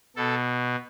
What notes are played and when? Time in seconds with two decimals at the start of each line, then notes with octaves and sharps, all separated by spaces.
0.16 B2 A4